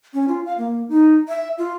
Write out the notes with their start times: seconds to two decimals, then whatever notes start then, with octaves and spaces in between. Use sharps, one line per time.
0.14 C#4
0.28 F4
0.46 F5
0.58 A#3
0.89 D#4
1.28 E5
1.58 F4